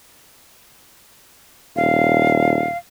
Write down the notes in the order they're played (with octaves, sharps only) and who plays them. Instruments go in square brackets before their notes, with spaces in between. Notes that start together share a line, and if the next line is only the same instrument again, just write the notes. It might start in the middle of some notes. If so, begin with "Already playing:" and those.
[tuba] D#1 [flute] F5